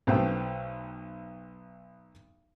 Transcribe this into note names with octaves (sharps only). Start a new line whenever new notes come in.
B1 A3 B3 C5 G5